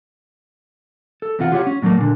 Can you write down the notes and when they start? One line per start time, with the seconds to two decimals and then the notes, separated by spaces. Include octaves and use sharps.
1.22 A4
1.39 E2 C3 F4 F#5
1.52 F4 G4 C#5 F#5
1.67 C#4
1.82 A2 F#3 A3 A#3
1.98 A#2 D3